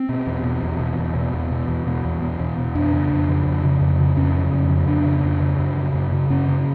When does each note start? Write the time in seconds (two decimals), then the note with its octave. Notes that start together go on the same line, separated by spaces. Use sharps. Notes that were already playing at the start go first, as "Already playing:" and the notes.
Already playing: C4
0.09 B2
0.26 E2
0.44 B2
0.63 E2
0.80 B2
0.98 E2
1.15 B2
1.34 E2
1.51 B2
1.69 E2
1.87 B2
2.05 E2
2.22 B2
2.40 E2
2.58 B2
2.75 F2 D4
2.93 C#3
3.11 F2
3.29 C#3
3.47 F2
3.65 C#3
3.81 F2
4.00 C#3
4.17 F2 C#4
4.35 C#3
4.53 F2
4.70 C#3
4.88 F2 D4
5.06 C#3
5.24 F2
5.42 C#3
5.59 F#2
5.78 C#3
5.94 F#2
6.12 C#3
6.30 F#2 C#4
6.48 C#3